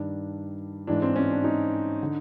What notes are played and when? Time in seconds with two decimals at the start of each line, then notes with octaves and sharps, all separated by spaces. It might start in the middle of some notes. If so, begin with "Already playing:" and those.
Already playing: G2 D#3 D4
0.87 G#2 E3 D4
1.02 C4
1.16 C#4
1.30 D4
1.44 D#4
2.03 D3